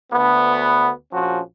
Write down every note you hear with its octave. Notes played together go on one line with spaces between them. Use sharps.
D2 B3
A#1 F3 C#4 F#4